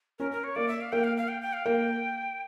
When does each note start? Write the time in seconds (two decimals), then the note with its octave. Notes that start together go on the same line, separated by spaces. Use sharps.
0.19 C#4 A#4
0.31 A#4
0.44 C#5
0.56 A#3 D5
0.68 E5
0.81 F5
0.92 A#3 G5
1.04 F5
1.17 F5
1.28 G5
1.42 G5
1.53 F5
1.66 A#3 G5